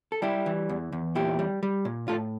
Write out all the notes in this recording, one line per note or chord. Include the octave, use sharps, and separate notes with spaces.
A4
G3 E4 G4
E3
E2
E2
A#2 E4 G4
G3
G3
A#2
A2 F4 A4